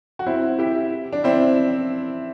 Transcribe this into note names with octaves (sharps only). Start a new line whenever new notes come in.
F#4
C4 E4
E4 G4
D4
C4 E4